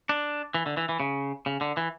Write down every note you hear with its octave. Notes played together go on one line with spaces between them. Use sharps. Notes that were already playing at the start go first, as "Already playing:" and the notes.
D4
E3
D3
E3
E3
C#3
C#3
D3
E3